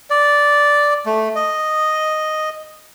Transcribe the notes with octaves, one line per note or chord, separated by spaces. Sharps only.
D5
A3
D#5